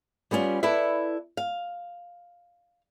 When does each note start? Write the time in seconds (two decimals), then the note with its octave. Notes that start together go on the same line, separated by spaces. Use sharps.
0.31 G3 B3 C#4 D#4 F4
0.63 E4 A4 B4 D5 E5
1.37 F5